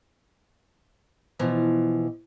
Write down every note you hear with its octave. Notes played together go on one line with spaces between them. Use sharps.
B2 E3 F3